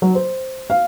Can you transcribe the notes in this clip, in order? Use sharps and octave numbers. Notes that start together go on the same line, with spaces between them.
F#3
C5
F5